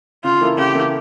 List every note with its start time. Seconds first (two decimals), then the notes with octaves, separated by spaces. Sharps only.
0.24 C#3 F4
0.41 E3 A#3 E4 A4
0.57 C#3 G4
0.74 E3 A#3 E4 A4